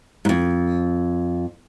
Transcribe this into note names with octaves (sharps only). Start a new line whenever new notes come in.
F2 G#2